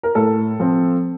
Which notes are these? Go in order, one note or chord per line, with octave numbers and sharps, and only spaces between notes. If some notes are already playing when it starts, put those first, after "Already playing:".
A#4
A2 A4
F3 C4